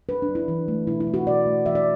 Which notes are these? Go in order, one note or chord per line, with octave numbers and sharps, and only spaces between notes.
D4 B4
D4
F#3
E4
E3 D4
A3
B2 E4
E4
A3
F#4
B2 D5
A3
E3 E5
D5